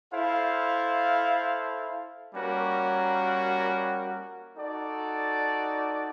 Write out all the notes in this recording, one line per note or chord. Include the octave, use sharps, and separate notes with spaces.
E4 A4 C5 F5
G3 A#3 C#4 F#4 A#4
D#4 F#4 A4 D5